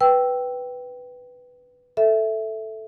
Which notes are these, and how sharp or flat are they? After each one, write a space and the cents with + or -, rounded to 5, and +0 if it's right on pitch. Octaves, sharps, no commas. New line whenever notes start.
B4 +0 G5 -5 E6 +0
A4 +0 E5 +0